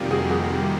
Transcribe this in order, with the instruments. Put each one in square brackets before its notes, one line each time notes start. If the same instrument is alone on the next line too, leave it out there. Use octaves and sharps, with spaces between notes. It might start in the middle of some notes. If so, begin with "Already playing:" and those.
Already playing: [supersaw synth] F2 C3 D#3 G3 A#3 [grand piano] F4 G4
[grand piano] F#4 G#4
F#4 G#4